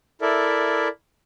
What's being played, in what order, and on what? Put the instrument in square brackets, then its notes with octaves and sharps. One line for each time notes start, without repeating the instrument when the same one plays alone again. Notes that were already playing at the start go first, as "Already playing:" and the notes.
[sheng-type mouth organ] E4 A4 A#4 D5 E5